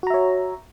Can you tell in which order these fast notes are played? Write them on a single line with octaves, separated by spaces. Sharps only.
F#4 A#5 E5 C#5